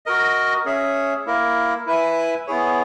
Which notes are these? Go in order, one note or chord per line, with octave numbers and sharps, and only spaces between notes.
F#4 A#4 D#5
C#4 G#4 C#5 E5
A#3 E4 A#4
E4 B4 E5 G#5
B3 E4 G#4 C#5